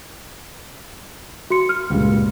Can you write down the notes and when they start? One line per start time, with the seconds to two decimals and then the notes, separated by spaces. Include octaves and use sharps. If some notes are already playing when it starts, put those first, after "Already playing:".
1.50 F#4 C6 C#7
1.69 F6
1.90 C#2 G2 A#2